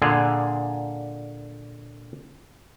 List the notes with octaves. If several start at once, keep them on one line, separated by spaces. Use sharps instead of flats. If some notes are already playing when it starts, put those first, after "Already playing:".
A#2 D3 G#4